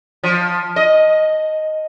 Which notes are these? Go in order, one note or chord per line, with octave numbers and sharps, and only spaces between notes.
F3
D#5